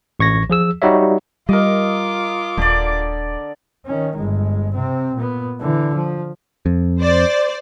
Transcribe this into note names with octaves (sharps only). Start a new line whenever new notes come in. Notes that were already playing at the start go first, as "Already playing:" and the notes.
A1 C#6 G#6 A#6
F3 G#4 E6
G3 D#4 F#4 G4 C#5 E5
G3 F4 A#4 D#5 D6
D#1 D3 D5
D#3 C#4
G1 G#3
C3 C4
A#2 B3
D3 E3
F3
F2
C5 D5